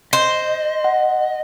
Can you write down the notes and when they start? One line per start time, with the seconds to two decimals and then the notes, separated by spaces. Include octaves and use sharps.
0.13 C5 D#5
0.84 F#5